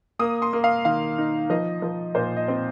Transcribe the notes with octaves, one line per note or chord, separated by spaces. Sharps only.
A#3 D#6
C6
A#3
F5
D#3 F5
D#4
F3 D#5
F3
A#2 C5
D#5
C4